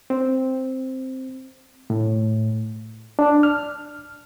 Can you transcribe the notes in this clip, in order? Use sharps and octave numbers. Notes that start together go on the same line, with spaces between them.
C4
A2
D4
F6